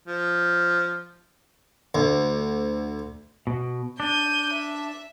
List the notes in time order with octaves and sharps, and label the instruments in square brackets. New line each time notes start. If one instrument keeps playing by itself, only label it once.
[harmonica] F3
[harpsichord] D2
[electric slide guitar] B2
[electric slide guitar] D4 [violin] G6 D#7
[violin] E5